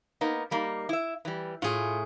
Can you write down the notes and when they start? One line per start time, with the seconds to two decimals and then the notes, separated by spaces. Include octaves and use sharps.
0.21 A#3 B3 D#4
0.51 G3 A#3 D#4
0.89 E4 E5
1.25 E3 G3
1.62 A2 F4 G#4